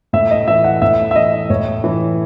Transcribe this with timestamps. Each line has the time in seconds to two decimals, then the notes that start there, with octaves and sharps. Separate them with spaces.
0.13 A2 E5
0.31 D#5
0.48 E3 E5
0.64 F#5
0.82 A2 E5
1.11 E5
1.15 E3 D#5
1.50 A2 C#5
1.84 E3